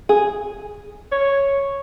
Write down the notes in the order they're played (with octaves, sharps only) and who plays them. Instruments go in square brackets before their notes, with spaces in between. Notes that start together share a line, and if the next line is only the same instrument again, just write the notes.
[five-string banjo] G#4
[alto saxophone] C#5